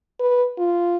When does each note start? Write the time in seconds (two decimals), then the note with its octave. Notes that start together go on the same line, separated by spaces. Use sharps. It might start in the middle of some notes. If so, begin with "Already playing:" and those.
0.20 B4
0.58 F4